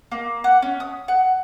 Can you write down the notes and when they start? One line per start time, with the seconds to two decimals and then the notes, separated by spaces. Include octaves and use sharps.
0.11 A#3
0.44 F#5
0.62 C#4
0.80 D#6
1.08 F#5